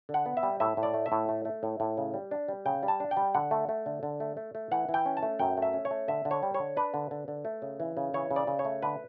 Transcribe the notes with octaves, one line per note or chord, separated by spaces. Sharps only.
D3
F#5
B3
E5
G3
A2 E5
A2
D5
A3
E5
A2
A3
A3
A2
A2
C#3
G3
D4
G3
C#3 G5
G3
A5
D4
G5
G3
D3 F#5
A3
A3
D3
D3
A3
A3
A3
E3 F#5
E3
G5
C#4
A5
A3
F#2 G5
A3
E5
C#4
C#5
A3
D3 E5
D3
C#5
G3
D3 C#5
D4 B4
D3
D3
D3
A3
C#3
E3
C#3
E3 C#5
C#3
D5
C#3
C#5
A3
D3 B4